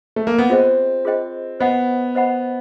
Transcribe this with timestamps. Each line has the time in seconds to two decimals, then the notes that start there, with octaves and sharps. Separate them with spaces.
0.16 A3
0.27 A#3
0.39 B3
0.50 C4 F4 G#4 C5 D#5 G5
1.05 F4 G#4 C5 D#5 G5
1.60 B3 C5 D#5 F#5 B5
2.15 C5 D#5 F#5 B5